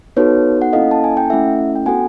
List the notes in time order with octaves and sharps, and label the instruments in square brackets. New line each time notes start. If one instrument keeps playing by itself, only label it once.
[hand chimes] B3 D#4 F#4 A4 B4 C#5
F#5
A#3 C#4 E4 A4 D#5 F5
A5
G#5
G5
A3 C#4 E4 A4 E5 F#5
G5
B3 D4 F#4 A4 F#5 G#5